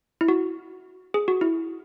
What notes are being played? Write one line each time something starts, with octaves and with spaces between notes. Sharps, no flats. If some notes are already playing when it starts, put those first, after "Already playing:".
E4
F#4
G#4
F#4
E4